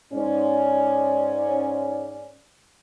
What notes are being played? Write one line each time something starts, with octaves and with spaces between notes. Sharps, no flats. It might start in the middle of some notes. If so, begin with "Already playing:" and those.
G#2 C#4 D5